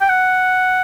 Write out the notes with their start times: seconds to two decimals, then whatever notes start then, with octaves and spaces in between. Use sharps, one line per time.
0.01 G5
0.09 F#5